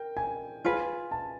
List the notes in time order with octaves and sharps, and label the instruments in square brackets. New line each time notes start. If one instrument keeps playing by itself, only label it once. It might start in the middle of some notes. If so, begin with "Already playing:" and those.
Already playing: [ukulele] A#4 [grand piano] G5
[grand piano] G#5
[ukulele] F4 G#4 B4
[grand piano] A5